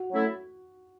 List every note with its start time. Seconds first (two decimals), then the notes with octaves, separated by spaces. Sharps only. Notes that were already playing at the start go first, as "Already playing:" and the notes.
Already playing: F#4
0.12 F#3 A3 C#4 E4 A4